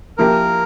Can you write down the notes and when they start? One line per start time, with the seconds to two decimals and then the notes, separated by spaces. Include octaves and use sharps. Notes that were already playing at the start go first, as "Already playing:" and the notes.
0.18 F3 A#3 E4 G4 A#4